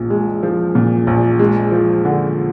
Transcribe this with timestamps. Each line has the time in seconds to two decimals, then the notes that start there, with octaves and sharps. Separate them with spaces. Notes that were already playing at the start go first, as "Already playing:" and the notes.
Already playing: A#1 A#2
0.10 G#3
0.43 F3
0.75 A#2
1.07 A#1
1.39 G#3
1.72 F3
2.05 D3